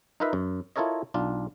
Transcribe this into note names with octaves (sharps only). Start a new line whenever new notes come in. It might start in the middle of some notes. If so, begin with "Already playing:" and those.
D#4 F4 A#4 B4 E5 F5
F#2
E4 F4 A4 A#4 C#5 D#5
B1 D4 F4